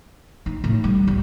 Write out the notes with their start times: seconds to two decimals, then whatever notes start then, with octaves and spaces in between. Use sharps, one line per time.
0.46 D#4
0.64 A2
0.84 G3
1.07 C#2